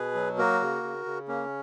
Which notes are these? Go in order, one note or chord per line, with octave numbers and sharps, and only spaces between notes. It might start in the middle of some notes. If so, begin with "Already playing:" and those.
Already playing: B2 G#4 B4
F#3
A#3 F#4 A#4
C#3
C#3
C#3
A#3 C#4